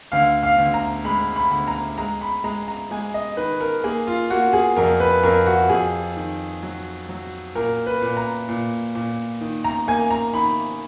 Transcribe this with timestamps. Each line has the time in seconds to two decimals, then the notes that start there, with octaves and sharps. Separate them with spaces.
0.12 D2 F5
0.43 F5
0.58 D2
0.74 A#5
1.05 G#3 B5
1.36 B5
1.51 D2
1.68 A#5
1.98 G#3 A#5
2.21 B5
2.44 G#3 A#5
2.68 A#5
2.91 G#3 G#5
3.14 D#5
3.37 D#3 B4
3.60 A#4
3.84 A#3 G#4
4.07 F4
4.30 A#3 F#4
4.53 G#4
4.76 F2 A#4
5.00 B4
5.23 F2 A#4
5.46 F#4
5.69 F2 G#4
6.17 D#3
6.63 F#3
7.09 F#3
7.55 A#2 A#4
7.87 B4
8.02 A#2
8.17 A#5
8.48 A#2
8.95 A#2
9.41 D#3
9.64 A#5
9.87 A#3 G#5
10.11 A#5
10.34 D#3 B5